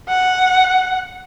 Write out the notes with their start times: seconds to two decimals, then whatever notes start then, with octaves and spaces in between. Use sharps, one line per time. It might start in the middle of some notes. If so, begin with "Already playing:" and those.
0.09 F#5